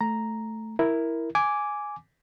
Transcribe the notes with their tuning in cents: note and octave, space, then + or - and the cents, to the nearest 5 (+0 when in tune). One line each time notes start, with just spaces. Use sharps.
A3 +0 A#5 +0
E4 +0 A#4 +0
G#5 +0 D6 -10